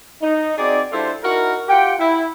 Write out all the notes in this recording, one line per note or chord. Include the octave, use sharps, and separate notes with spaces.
D#4
C4 D#4 F#4 G#4 D5
G3 D4 E4 F4 A4 C5
D#4 E4 F#4 A#4
F4 G4 F#5 G5
E4